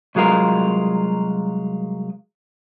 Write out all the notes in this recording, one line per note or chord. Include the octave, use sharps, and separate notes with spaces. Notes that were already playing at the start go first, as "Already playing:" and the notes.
C2 F#3 G#3 F4 A#4